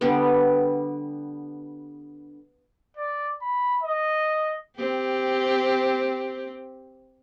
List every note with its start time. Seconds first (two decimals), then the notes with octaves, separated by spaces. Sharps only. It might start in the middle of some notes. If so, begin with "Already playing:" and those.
0.01 D3 G3 B3
2.97 D5
3.42 B5
3.83 D#5
4.76 C4 G4